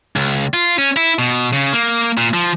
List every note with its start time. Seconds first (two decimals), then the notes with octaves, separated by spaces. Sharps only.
0.16 C#2
0.54 F4
0.78 C#4
0.97 E4
1.19 B2
1.53 C#3
1.73 A#3
2.18 A#2
2.34 F3